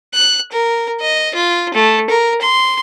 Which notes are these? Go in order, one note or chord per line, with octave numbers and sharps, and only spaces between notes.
F#6
A#4
D#5
F4
A3
A#4
C6